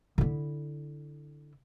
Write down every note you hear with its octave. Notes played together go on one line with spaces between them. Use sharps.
D3 E4